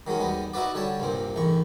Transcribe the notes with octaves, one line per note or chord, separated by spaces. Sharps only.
D#3 F#3 G#3 C#4
D#2 G3 B3
D#4 E4 F#4 B4 D5
D3 G3 C#5 A5
C2 G2 A#2 C4
A1 E2 D#3 C#6